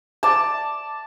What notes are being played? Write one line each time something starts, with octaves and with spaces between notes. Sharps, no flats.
D5 A5